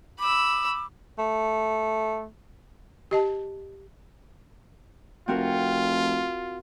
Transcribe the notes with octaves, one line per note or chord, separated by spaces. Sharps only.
B5 D6 E6
A3
G4 D#5 A5
F1 C4 F4 F#4 A#4